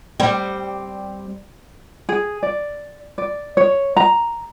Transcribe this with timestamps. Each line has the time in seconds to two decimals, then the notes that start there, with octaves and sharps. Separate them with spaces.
0.20 G3 C4
2.09 G#4
2.43 D5
3.18 D5
3.57 C#5
3.97 A#5